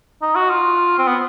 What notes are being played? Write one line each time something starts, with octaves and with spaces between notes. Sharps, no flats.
D#4
F#4
F4
C4
B3